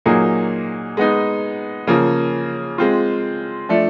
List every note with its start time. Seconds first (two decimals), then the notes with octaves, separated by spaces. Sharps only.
0.06 A#2 F#3 A#3 D#4 G#4
0.97 G#3 B3 D#4
1.87 C#3 F3 A#3
2.78 G#3 C4 F4
3.69 F3 A3 D4